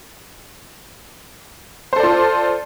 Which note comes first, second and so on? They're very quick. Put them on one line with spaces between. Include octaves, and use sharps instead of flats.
C5 A4 D5 F4